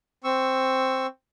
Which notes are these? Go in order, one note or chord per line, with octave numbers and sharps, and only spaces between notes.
C4 C#6 E6